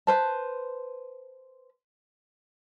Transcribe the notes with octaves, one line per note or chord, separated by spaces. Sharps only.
B4 C5 A5